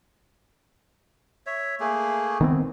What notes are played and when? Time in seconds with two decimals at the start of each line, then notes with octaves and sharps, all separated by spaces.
1.46 C#5 E5
1.80 A3 A#3 G#4
2.41 D#3 B3 C4